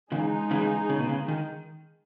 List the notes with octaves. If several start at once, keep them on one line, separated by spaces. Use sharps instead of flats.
C#3 E3 G#3 D#4 G#4
C#3 E3
C#3
B2
C#3
D#3